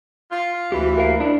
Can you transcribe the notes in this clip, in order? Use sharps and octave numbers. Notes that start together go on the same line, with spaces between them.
F4
D2 E3 G4
A#4 F5
D4 E4